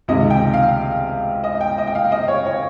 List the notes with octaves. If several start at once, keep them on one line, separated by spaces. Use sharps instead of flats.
C#2 C3 D#3 D#5
G5
F5
D#5
G5
D#5
G5
F5
D#5
C#5
C#5